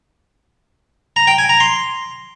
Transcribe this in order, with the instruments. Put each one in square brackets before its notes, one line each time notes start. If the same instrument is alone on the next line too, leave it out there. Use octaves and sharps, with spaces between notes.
[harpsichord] A#5
G5
G#5
A#5
C6